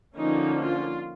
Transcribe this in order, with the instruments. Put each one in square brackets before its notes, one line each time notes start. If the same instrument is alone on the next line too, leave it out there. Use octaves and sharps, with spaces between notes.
[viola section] D3 F3 A#3 C#4 D#4
F4